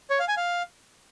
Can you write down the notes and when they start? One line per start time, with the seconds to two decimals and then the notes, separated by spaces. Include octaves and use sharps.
0.10 C#5
0.19 F5
0.28 G#5
0.37 F5